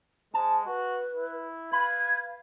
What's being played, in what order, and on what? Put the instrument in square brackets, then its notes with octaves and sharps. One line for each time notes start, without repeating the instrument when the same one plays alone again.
[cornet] G#3 [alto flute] C5 [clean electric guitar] A5
[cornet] F#4 [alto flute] B4
[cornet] E4
[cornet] B4 [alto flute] F5 [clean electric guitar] B5 [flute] G#6